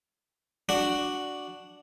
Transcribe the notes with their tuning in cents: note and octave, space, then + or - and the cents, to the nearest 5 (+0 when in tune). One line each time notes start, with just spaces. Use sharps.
D4 +0 F#4 +0